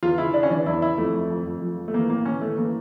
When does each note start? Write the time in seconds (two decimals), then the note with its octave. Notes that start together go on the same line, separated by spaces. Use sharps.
0.03 E2 F4
0.18 C#3 E4
0.34 C#3 D4
0.43 C#4
0.50 E3 D4
0.66 E2 E4
0.82 C#3 E4
0.98 F2 A3
1.14 F2
1.30 F2
1.46 F2
1.62 F3
1.77 F3
1.88 A3
1.94 E3 A#3
2.10 A2 A#3
2.25 E3 C#4
2.42 E3 A3
2.58 E3 A#3